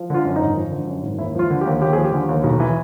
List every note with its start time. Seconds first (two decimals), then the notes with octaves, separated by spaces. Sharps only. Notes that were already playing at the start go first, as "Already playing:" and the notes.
Already playing: F3
0.10 D3 F4
0.25 F#2
0.36 D#4
0.41 G#1
0.57 F3
0.71 D3
0.87 F#2
1.03 G#1
1.18 D#2 E4
1.35 F3 F4
1.50 D3
1.61 G4
1.66 D#2
1.82 D#2 G4
1.93 F3 G#4
2.04 G4
2.12 D3
2.29 D#2
2.44 B1
2.60 E3